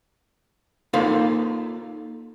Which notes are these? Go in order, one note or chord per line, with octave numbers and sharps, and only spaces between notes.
A#3 D#4 F4 A4 B4